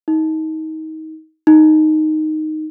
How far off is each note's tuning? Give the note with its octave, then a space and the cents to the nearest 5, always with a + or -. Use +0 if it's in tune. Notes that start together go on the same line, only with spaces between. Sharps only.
D#4 +25
D#4 -5